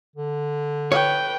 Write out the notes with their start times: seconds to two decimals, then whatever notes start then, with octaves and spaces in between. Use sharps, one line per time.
0.16 D3
0.92 B4 C#5 G5